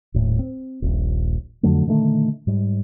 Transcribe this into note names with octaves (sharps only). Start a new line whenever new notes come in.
D#1 A2
C4
D#1 A#1
F2 D3 F#3 A3
A#2 D3 D#3 A3
G#2 G3